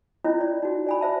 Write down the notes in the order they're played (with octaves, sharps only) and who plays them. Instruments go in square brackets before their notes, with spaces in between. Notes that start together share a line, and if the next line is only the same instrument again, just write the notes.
[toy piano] C#4 E4 F4 C#5 D#5
D5
D#4 F#4
D5 G#5 B5
C5 E5 A5